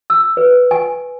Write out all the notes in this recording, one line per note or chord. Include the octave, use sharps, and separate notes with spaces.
E6
B4
G#5